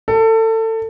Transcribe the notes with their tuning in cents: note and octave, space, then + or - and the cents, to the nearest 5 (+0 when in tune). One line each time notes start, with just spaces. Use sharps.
A4 +25